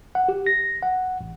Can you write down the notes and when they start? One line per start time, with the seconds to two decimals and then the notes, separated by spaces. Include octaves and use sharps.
0.15 F#5
0.28 G4
0.46 A#6
0.83 F#5
1.21 A1